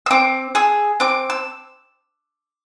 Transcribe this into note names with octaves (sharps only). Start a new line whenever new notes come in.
E6
C4 D6
G#4 E6
C4 D6
E6